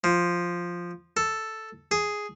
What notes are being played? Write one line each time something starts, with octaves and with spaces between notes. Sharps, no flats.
F3
A4
G#4